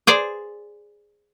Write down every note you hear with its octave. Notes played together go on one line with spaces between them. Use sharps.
G#4 C5 D5